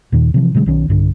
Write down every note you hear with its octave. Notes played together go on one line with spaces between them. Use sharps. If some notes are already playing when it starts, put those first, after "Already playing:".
D#2 A#2 D#3
C3 E3 F3
B2 D3 G3 G#3
B1 D#3 C#4
B1 G2 D3